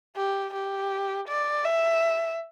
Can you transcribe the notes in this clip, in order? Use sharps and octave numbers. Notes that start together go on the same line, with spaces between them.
G4
G4
D5
E5